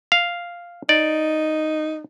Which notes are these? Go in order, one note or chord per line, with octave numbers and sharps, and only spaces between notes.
F5
D#4 D5